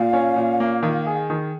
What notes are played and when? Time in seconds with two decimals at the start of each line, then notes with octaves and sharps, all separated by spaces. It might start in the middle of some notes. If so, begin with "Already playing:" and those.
Already playing: A#2 F5
0.13 C#4
0.36 A#2
0.60 A#3
0.83 D#3
1.06 G#4
1.30 D#3